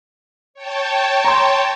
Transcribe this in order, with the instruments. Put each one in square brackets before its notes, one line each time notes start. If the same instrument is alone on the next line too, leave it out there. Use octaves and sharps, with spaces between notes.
[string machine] C#5 G5 A5
[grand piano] A#5 C6